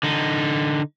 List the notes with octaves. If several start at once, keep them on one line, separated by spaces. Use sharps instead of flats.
D3 D#4